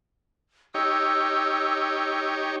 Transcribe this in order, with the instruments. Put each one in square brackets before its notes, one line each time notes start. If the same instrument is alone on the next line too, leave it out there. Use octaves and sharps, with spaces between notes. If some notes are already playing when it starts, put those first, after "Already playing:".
[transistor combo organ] D#4 G4 C#5 [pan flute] E6